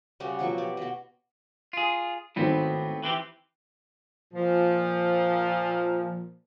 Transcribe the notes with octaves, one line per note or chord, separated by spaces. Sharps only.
C#3 G3 F#4 G4
B2 F3 F#3 C#6
G4 D5
B2 F#4
F4 G#4
G#1 A2 B3 C4 D#4 C5
E3 C4 G4
A#2 F3